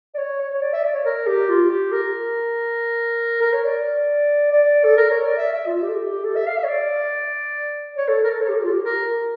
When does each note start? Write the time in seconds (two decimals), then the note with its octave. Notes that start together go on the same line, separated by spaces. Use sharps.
0.14 D5
0.18 C#5
0.40 C#5
0.53 C#5
0.61 D5
0.73 E5
0.84 D5
0.94 C#5
1.05 A#4
1.27 G4
1.49 F4
1.69 G4
1.92 A#4
3.41 A#4
3.53 C#5
3.65 D5
4.51 D5
4.84 A4
4.97 A#4
5.10 C#5
5.25 D5
5.37 E5
5.52 E5
5.66 F4
5.82 G4
5.89 A4
5.96 G4
6.24 A4
6.36 E5
6.47 F5
6.57 E5
6.64 C#5
6.68 D5
7.97 C#5
8.08 A4
8.23 A#4
8.30 A4
8.41 C#5
8.49 G4
8.55 A4
8.63 F4
8.70 G4
8.84 A#4